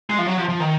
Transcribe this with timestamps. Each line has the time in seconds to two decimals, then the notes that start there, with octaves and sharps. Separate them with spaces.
0.10 G#3
0.18 F3
0.27 F#3
0.38 F3
0.49 F3
0.60 D#3